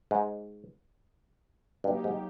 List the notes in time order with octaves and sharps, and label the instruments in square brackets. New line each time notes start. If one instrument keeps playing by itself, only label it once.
[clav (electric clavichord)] G#2
[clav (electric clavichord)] G2 [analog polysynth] F#3 A#3 D#4 G4
[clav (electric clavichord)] G#2